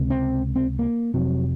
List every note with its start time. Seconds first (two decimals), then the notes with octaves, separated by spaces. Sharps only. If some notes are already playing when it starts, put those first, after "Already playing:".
Already playing: C#2 C3
0.10 C4
0.56 C4
0.79 A#3
1.14 F1 F2 C3 F#3